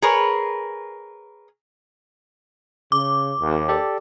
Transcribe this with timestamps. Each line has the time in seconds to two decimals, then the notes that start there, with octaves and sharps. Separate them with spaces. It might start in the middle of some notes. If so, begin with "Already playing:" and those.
0.02 G#4 A#4 B4 C#5
2.92 C#3 D6
3.39 D#2
3.69 G4 A4 D5